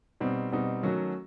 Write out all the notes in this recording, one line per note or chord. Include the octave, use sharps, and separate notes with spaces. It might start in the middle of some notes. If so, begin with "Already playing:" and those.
B2 G3 C4 D#4
B2 G3 C4 D#4
D#3 F#3 A3 C#4 F#4